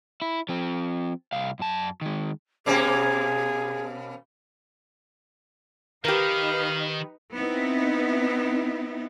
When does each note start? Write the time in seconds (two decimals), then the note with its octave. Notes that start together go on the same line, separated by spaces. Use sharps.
0.22 E4
0.49 F3 C4
1.33 C2 F5
1.59 F#2 A5
2.01 D#3 G#3
2.66 B2 A#3 C#4 G#4
6.05 D#3 D#4 G4 A#4 B4 F5
7.36 B3 C4 D#4 E4